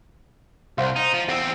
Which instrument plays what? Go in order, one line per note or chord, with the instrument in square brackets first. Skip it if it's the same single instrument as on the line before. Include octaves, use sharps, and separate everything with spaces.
[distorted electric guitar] C2 [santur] C5 F5 F#5
[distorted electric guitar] D#4
F3
[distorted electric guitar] E2 C4 [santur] F#5 E6